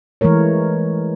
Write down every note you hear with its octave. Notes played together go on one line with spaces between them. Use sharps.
E3 G#3 A3 A#4 C#5